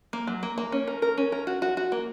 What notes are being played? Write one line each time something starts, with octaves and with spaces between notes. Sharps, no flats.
A#3
F#3
A#3
A#3
C#4
A#4
A#4
C#4
A#4
F#4
F#4
F#4
A#3